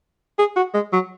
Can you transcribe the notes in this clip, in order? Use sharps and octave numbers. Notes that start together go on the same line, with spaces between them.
G#4
F#4
G#3
F#3